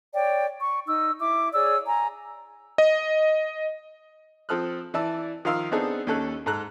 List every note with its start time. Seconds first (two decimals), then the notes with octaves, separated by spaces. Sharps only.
0.15 C#5 D5 G5
0.60 C#6
0.86 D#4 E6
1.19 E4 D6
1.53 G#4 C#5 D5 E6
1.87 G#5 A#5
2.78 D#5
4.49 F3 C4 A4 D#6 F6 F#6
4.94 E3 E4 D5 A5 E6
5.45 D#3 F3 A#4 F5 C6 E6
5.71 B3 C4 D4 D#4 G#4 A4
6.07 D#2 C#4 A4 F#6
6.46 G#2 A4 A#5 F#6